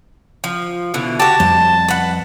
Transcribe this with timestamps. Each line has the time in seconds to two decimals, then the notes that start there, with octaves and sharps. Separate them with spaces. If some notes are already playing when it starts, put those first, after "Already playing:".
0.44 F3
0.94 B2 D3 E3
1.20 F#4 G4 A5
1.40 F2 G3 C5
1.88 B4 F#5